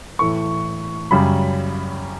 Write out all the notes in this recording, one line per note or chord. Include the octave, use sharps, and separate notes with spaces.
A2 E3 A3 C#6
F#2 C#3 G3 B5